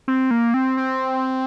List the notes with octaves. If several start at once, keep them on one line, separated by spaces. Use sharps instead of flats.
C4
A#3
C4
C4